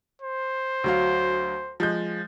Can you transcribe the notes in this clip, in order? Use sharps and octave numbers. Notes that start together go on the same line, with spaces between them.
C5
D2 F#3 F5
F3 G#3 G6